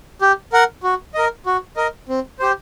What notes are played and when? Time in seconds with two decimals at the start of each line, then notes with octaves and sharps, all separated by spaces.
0.21 G4
0.53 A#4 F#5
0.83 F#4
1.14 A#4 D#5
1.46 F#4
1.76 A#4 D#5
2.09 C4
2.39 G4 C5